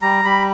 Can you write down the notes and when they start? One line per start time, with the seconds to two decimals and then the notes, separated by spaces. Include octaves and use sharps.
0.02 G3 A#5
0.25 G3 B5